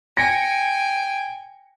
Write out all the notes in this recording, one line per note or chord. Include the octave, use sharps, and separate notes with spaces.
G5 G#5 A#6 C#7